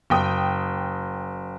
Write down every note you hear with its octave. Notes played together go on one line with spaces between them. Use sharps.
F#1 G5 D#6